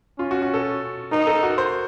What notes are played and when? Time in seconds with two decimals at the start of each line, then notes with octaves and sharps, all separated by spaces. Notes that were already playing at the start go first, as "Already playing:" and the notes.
0.18 C#4 F4
0.31 F#4
0.42 F#4
0.54 A4
1.12 D#4 A#4
1.27 A4
1.43 F#4
1.50 A#4
1.58 C5